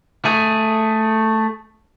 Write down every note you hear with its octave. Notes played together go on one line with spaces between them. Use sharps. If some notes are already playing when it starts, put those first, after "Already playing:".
A3 G#4